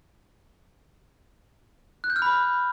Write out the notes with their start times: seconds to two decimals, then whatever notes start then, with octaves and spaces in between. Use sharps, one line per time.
2.04 F#6
2.10 G6
2.16 F6
2.22 B5